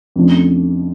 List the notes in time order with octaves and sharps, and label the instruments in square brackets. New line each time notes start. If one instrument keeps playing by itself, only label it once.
[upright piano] F2 C#3 F3 A3 D4